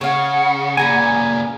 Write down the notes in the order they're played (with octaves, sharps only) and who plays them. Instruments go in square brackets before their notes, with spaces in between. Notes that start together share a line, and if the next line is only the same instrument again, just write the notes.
[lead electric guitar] C#3 [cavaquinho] C#5 F5 [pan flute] F#5
[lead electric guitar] A#2 C#3 [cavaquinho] G#4 A#5 B5 [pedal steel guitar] G#5